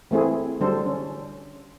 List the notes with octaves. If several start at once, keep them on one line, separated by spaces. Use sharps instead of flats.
E3 A3 C4 E4 G#4
D3 F#3 G3 D4 A4 C5
C#4